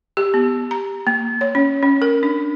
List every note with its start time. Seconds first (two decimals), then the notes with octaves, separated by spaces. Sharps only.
0.17 G4
0.34 B3
0.71 A#5
1.07 A#3
1.41 C#5
1.55 C#4
1.83 C#4
2.02 A#4
2.23 D4